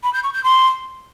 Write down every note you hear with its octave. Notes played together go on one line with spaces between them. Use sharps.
B5
G6
C#6
G6
C6